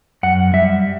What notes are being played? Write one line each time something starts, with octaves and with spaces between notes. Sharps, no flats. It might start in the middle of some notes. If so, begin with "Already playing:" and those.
F#2 F#5
G3 E5